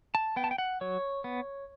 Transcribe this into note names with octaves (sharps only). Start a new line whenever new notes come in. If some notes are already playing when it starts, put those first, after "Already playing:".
A5
B3 G5
A5
G5
F#5
F#3 C#5
B3